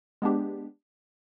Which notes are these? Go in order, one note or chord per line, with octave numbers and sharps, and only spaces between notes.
G#3 B3 D4 G4